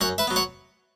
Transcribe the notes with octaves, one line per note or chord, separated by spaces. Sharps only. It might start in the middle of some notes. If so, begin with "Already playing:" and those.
F#2 C#5 F#5
B4 E5
F#3 B3
C#5 F#5